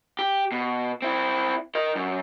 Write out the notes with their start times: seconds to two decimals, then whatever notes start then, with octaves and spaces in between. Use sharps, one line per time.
0.19 G4
0.52 B2
1.02 C4 E4
1.75 A#4 D#5
1.96 F#2